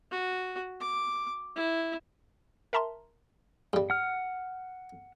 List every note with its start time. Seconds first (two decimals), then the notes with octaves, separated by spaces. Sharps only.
0.11 F#4
0.81 D6
1.56 E4
2.73 A#4 E5 A5 A#5 C6
3.73 G2 G3
3.90 F#5 F6